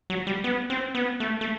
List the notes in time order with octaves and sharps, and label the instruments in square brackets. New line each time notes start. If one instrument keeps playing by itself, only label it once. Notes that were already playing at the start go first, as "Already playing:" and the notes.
[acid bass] F#3
G3
B3
C4
B3
A3
A3